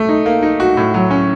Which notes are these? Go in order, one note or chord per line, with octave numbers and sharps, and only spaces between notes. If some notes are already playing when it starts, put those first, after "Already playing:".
Already playing: A3
D#4
A#3
D#4
F#4
A2
F#3
C#4